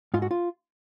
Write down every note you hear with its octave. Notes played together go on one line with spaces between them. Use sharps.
G#2 F4
F#4
F4